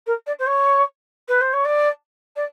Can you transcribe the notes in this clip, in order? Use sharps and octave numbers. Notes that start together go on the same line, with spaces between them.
A#4
D5
C5
C#5
B4
C5
C#5
D5
D5